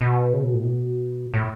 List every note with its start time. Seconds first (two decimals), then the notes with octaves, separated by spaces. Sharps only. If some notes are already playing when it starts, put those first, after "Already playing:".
0.01 B2
0.33 C#3
0.43 B2
0.54 A2
0.63 B2
1.34 A2